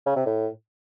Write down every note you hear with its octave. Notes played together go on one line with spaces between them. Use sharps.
C#3
C3
A2